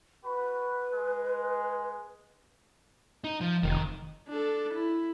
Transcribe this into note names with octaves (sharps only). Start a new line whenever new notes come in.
F#4 B4 B5
G#3
D#4 D#5
F3
F1 D#3
D4 A4
E4